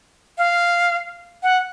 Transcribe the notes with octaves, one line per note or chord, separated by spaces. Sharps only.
F5
F#5